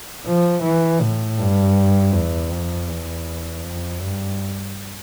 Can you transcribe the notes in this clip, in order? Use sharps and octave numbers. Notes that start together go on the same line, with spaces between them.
F3
E3
A2
G2
E2
F2
E2
F2
G2